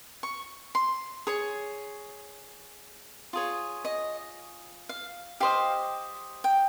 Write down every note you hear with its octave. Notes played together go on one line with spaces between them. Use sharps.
C#6
C6
G#4 C#5
F4 G#4 C#5
D#5
F5
G4 C5 D#5 F5
G5